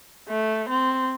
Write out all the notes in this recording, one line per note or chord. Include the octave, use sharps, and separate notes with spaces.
A3
C4